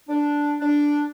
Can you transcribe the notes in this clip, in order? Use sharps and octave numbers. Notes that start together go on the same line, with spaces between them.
D4
D4